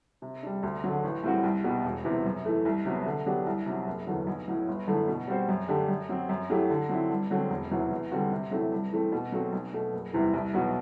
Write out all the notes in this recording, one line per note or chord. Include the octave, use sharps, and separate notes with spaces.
C3
G3 D4
D2
D3 F#3
A1
A2 G3 C4 F#4
C2
B2 G3 B3
E1
E2 C3
F#2
E3 A3
C2
C3 F#3 B3
D3
F#3 B3 D4 G4
C2
C3 F#3
F#1
E2 D3 F#3
B1
A2 F#3
G1
F#2 D3 A3 E4
B2
G3 C4 F#4 C5
F#2
D3 A3 D4 G4
F#2
F#3 C4
F#2
F#3 A3 E4 G4
D3
F#3 C4 E4
G2
D3 F#3 A3 C4
E1
E2 C3 F#3
E2
D3 G3 C4 F#4
C3
F#3 A3 C4 E4
G2
E3 A3 C4
B2
F#3 A3 C4 F#4
B1
B2 A3
F#1
E2 C3 E3 G3
C2
B2 F#3 B3 F#4